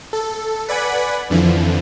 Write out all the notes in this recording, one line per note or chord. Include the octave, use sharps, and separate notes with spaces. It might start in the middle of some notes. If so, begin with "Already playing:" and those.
A4
B4 D5 F#5 G#5 B5
F2 D3 E3 F3